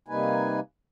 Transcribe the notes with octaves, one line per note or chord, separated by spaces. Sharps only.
C3 G3 A#3 D#4 B4 G#5